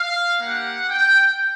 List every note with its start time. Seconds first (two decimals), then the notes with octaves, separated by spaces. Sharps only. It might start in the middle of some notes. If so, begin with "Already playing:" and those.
Already playing: F5
0.42 A#3 D4 G4 F#5
0.90 G5